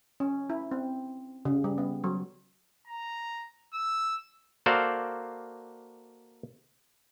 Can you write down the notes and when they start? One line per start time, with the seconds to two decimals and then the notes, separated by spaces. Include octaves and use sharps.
0.20 C#4
0.50 E4
0.71 C4
1.45 C#3
1.64 G3
1.78 B3
2.04 F#3
2.87 A#5
3.74 E6
4.66 A#3 F#4 A4 C5 D5 F5